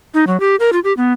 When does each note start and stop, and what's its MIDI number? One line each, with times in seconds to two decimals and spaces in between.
0.14 0.25 63
0.27 0.39 54
0.40 0.56 67
0.60 0.70 70
0.73 0.80 65
0.84 0.93 67
0.97 1.13 59